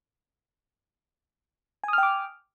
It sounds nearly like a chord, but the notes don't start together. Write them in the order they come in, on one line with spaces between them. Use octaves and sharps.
G#5 D#6 F6 G5 D6